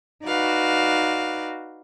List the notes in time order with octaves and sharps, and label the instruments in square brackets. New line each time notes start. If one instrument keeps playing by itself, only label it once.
[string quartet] D#4 F#4 B4 D5 F5